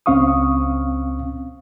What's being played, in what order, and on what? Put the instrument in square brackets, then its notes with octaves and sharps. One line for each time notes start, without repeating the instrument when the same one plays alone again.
[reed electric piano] C#2 C4 C#4 F5 C#6 D#6